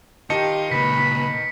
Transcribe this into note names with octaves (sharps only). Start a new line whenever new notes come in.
D#3 F4 G4 D#5 A5 C#7
C#2 A#2 B4 B5 B6